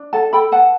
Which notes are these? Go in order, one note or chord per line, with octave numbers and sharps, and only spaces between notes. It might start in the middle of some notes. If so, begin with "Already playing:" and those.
Already playing: D4
A4 F#5 A5
A4 G5 B5
B4 F#5 A5